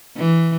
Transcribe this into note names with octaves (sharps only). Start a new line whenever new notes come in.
E3